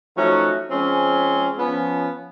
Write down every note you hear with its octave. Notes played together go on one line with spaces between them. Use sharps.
F3 F#3 A3 C#4 D#4 F#4
F3 G#3 C4 C#4
F3 B3 C#4